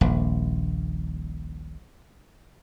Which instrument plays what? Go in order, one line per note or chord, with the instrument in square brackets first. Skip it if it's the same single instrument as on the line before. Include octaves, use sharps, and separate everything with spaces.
[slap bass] D#1 A#1